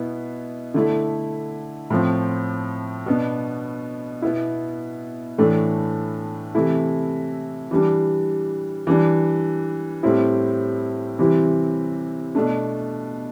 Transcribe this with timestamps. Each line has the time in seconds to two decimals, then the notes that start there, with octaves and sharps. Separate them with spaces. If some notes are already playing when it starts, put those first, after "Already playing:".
Already playing: B2 B3 E4
0.74 D3 A3 E4
1.90 A2 F3 C4
3.06 B2 B3 D4
4.22 B2 B3 E4
5.38 A2 E3 A3 D4
6.55 C3 E3 A3 E4
7.71 E3 G3 D4
8.87 E3 G3 D4
10.03 A2 G3 C4 E4
11.19 C3 E3 G3 C4 E4
12.35 B2 A3 D4